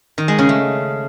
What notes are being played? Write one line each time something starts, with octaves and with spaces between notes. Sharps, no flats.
D#3
G#3
C#3
A3